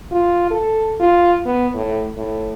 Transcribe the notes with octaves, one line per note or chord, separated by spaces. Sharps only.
F4
A4
F4
B3
A2
A2